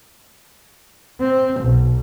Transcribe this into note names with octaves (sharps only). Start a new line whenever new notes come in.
C4
B1